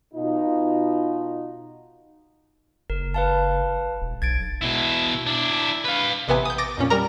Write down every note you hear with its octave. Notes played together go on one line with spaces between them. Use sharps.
B2 D#4 F4
F#1 A#4
B4 F5 A5
E1
B1 G#6 A6 D7
B2 E4
D4 E4
B4 F5
A1 C3 B3 G#5
D#6 G6
D6 A6 A#6 D7
F2 A#2 C#4
G3 A#4 A#5